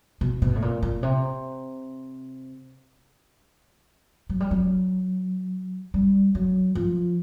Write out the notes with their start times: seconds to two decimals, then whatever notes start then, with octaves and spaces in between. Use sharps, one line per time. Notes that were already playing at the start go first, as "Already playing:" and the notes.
0.21 B2
0.42 B2
0.55 A2
0.62 A#2
0.82 A#2
1.03 C3
4.29 F#3
4.40 G3
4.51 F#3
5.94 G3
6.35 F#3
6.75 F3